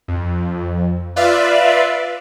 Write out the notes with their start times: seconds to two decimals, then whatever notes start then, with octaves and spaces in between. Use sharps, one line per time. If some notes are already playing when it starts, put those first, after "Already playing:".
0.08 F2
1.16 F4 B4 D5 E5 F5